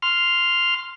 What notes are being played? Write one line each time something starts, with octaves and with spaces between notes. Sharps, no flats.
C6 F6